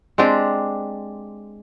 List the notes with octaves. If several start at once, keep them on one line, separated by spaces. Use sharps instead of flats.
G#3 C4 D4 G4